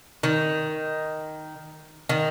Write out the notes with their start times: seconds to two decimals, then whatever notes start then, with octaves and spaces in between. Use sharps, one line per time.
0.23 D#3
2.09 D#3